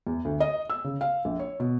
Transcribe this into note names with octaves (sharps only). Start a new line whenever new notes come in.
E2
D2
D#5
E6
C#3
F5
A#1
C#5
B2